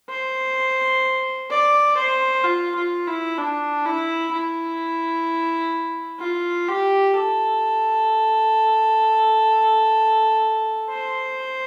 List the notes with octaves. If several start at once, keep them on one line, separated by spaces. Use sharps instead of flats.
C5
D5
C5
F4
F4
E4
D4
E4
E4
F4
G4
A4
C5